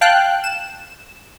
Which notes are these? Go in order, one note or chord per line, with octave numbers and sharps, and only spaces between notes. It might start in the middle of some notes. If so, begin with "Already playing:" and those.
F5 G5 A5 F#6
E7